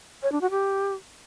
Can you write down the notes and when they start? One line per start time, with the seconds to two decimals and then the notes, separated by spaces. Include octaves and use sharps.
0.23 C#5
0.32 D4
0.41 F#4
0.51 G4